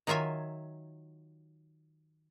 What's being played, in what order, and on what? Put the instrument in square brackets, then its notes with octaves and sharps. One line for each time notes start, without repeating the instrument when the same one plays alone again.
[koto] D#3 F#3 F4 E5 G#5